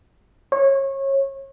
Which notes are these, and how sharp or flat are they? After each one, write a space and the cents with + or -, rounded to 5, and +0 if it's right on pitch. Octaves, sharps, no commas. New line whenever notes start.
C#5 -25